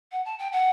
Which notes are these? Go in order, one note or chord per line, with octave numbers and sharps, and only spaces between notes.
F#5
A5
G5
F#5